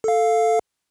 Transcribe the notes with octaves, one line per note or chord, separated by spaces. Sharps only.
A4 F5